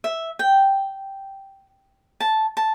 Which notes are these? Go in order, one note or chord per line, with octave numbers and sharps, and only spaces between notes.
E5
G5
A5
A5